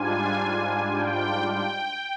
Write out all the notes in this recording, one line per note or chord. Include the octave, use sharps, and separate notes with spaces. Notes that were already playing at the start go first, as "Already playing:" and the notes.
Already playing: G#2 G3 D4 F4 G#5
G5
G5